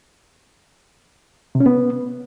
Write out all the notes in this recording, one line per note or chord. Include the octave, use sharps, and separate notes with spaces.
C3
C#4
B3